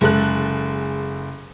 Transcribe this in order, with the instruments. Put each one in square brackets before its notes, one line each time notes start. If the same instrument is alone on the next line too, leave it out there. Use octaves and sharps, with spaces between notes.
[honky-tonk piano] F#1 G#3 A4 F#6